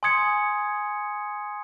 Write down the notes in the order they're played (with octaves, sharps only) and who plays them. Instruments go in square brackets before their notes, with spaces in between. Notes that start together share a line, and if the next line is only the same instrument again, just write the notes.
[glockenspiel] G#5 C6 D#6 G#6 C#7